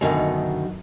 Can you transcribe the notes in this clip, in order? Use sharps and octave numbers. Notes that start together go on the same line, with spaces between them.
F#2 B2 D3 D#3